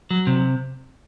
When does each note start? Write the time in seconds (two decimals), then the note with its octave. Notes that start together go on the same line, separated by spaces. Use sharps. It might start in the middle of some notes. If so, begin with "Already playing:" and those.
0.11 F#3
0.27 C3